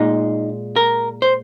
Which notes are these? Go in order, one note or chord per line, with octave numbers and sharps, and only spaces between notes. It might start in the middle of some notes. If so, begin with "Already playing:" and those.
Already playing: A#2 G#3 D#4
A#4
C5